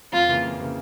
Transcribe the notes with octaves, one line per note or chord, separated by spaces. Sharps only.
F2 F4
C#3 E3 A#3
F2
C#3 E3 A#3